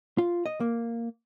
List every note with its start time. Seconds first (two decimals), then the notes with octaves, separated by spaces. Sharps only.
0.18 F4
0.46 D#5
0.60 A#3